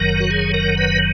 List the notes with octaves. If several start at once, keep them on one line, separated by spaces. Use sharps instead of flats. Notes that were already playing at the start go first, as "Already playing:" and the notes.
Already playing: F#1 F#2 D#3 F#3 A#4
F#4
G#4
A#4
B4